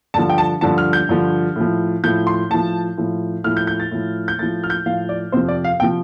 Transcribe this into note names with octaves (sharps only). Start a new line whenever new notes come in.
G2 D3 F3 A5
G5
A5
G2 D3 F3 A5
F6
G6
G2 D3 F3
A2 F3
A2 F3 G6
C6
A2 F3 A5
A2 F3
A2 F3 F6
G6
G6
A6
A2 F3
G6
A2 F3 A6
F6
G6
A2 F3 F5
D5
F2 C3 F3 C5
D5
F5
C3 F3 G5